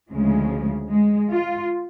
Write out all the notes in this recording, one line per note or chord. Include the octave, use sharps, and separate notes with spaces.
D2 C#3 F3 G#3
G#3
F4